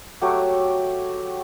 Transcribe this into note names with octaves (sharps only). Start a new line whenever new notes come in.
F#3 A3 F#4 G4